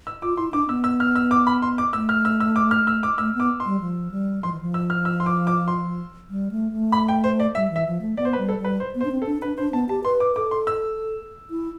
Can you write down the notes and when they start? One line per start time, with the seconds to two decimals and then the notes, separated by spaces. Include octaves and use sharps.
0.07 E6
0.22 F4 D6
0.37 E4 C6
0.53 D4 D6
0.69 B3 E6
0.84 E6
1.00 F6
1.15 E6
1.31 D6
1.47 B5
1.62 C6
1.78 D6
1.93 A3 E6
2.09 F6
2.25 E6
2.40 E6
2.56 D6
2.71 F6
2.87 E6
3.03 D6
3.18 A3 E6
3.34 B3
3.40 D6
3.60 C6
3.66 G3
3.80 F3
4.11 G3
4.43 F3 C6
4.52 E3
4.61 F3
4.74 E6
4.90 F6
5.05 E6
5.20 C6
5.26 D6
5.47 D6
5.68 C6
6.30 G3
6.51 A3
6.72 A3
6.92 B5
7.08 G5
7.24 C5
7.40 D5
7.55 G3 E5
7.70 E3
7.76 E5
7.87 F3
8.01 A3
8.17 B3 D5
8.25 C5
8.33 B4
8.38 G3
8.49 A4
8.59 G3
8.64 B4
8.80 C5
8.95 B3
9.01 C5
9.05 D4
9.11 C4
9.22 A4
9.26 D4
9.42 D4 B4
9.58 D4 C5
9.73 B3 A5
9.89 G4 A5
10.04 B4 C6
10.20 D6
10.36 A4 D6
10.51 C6
10.67 E6
11.50 E4